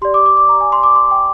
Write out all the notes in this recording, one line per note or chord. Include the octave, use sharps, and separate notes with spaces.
G4 D5 C6
D6
D6
D6
A#5
G#5
C6
D6
C6
G5